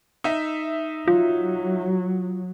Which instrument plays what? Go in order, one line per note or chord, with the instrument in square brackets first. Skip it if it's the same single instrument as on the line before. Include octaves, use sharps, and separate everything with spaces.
[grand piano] D#4 E5
[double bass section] F#3 [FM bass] F4